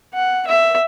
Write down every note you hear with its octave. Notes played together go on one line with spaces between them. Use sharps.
F#5
E5